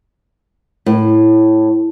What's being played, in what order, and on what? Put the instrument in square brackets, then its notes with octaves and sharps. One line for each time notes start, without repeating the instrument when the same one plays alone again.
[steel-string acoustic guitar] A2